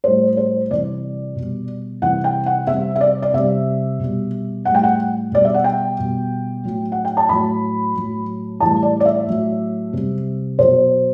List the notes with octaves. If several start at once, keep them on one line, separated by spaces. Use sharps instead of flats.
A2 G3 C5
C5
C3 E3 G3 D5
B2 G3
C3 E3 G3 F#5
G5
F#5
C3 G3 E5
E5
D5
D5
C3 G3 E5
B2 G3
A2 G3 F#5
G5
F#5
B2 G3 D5
E5
F#5
G5
B2 G3
A2 F#3
F#5
G5
A5
A2 F#3 B5
A2 F#3
A2 E3 G3 A5
D5
D5
E5
A2 F#3
C3 G3
B2 F#3 C5